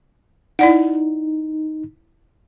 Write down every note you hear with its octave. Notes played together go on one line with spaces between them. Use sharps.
D#4 E4 D5 F#5